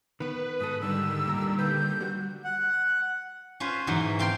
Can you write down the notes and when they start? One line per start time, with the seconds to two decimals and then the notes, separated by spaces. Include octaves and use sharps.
0.20 D#3 B3 B4
0.60 G#2 A4 D#6
0.81 D3 D#3 G3 E6
1.26 D#2 A#2 A#5
1.59 A#3 B4 G6
2.00 G3 F#4
2.44 F#5
3.60 C#4 F4 B4 C5
3.87 G#2 B2 E3 F#3
4.19 C4 F5 G5 A5 C6